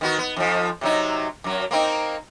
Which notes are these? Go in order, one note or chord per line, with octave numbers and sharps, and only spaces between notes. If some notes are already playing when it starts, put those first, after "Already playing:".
D#3 B3 F#4
B3
F2 F3
C3 F#3 D#4
F#2 F#3
A#3 C4 D#4